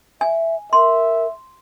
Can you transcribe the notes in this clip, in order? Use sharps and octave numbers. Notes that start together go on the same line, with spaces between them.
E5 G#5
A#4 E5 C6